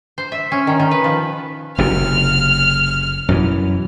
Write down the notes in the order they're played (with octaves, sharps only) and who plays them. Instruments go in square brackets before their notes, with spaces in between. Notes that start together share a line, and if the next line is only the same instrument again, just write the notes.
[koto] C5
E5
C#4
D#3
D#3
B4
F3
[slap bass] F#1 F#2 C3 [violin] F6
[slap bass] F#2 B2 E3